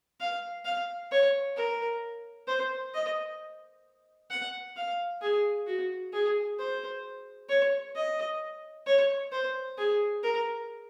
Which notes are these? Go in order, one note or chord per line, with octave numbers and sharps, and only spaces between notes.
F5
F5
C#5
A#4
C5
D#5
F#5
F5
G#4
F#4
G#4
C5
C#5
D#5
C#5
C5
G#4
A#4